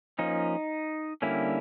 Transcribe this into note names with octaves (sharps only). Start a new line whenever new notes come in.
F3 A#3 C#4 D#4
D3 G3 A#3 C#4 E4